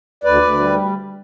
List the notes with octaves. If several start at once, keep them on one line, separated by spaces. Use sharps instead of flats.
D2 B4 D5
D2
G3